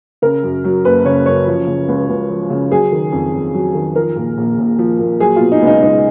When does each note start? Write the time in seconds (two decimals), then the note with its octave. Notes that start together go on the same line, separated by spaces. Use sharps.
0.22 C#3 A#4
0.43 F#2
0.64 F#3
0.85 F#1 B4
1.05 C#3 C#5
1.26 F#2 C#5
1.47 F3
1.67 C#3
1.88 C#2
2.09 C#2
2.30 F3
2.50 C#3
2.71 F#3 G#4
2.92 D#3
3.12 F2
3.34 F2
3.54 F#3
3.75 D#3
3.96 F3 A#4
4.16 A#2
4.38 A#1
4.59 A#1
4.79 F3
4.99 A#2
5.20 F#3 G#4
5.36 B2 F4
5.52 D#4
5.62 C#2
5.67 D#4
5.82 C#2 D#4